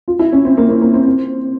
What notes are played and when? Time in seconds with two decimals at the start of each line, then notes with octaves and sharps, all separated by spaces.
0.08 F4
0.19 E4
0.33 C#4
0.45 C4
0.57 A#3
0.69 A#3
0.81 A#3
0.94 C4
1.06 C4